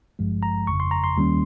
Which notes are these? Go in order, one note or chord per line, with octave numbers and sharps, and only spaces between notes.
G#1 G2 F3 G#3
A#5
G1 F2 C#3 C#6
C6
A#5
C6
D#2 D#3 G3 A#3 C#4